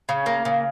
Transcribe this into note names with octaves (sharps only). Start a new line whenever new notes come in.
C#3
A#3
C#3